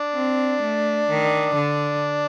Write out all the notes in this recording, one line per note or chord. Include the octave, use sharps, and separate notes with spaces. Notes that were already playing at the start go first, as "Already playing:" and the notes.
Already playing: D4
C4
A3
D#3
D3